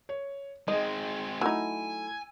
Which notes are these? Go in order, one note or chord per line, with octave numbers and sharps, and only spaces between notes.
C#5
G#3 C4 D#4 G#4 D#5
F#3 A3 D#4 E4 G#5 E6